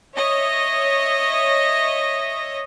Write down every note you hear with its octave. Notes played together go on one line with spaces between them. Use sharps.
C#5 D#5 E5